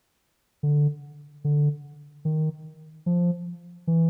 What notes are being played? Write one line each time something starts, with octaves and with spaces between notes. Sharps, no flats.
D3
D3
D#3
F3
E3